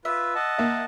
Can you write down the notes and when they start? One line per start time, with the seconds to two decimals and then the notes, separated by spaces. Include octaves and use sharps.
0.05 F4 B4 E5
0.35 D#5 F#5 A5
0.58 A#3 E5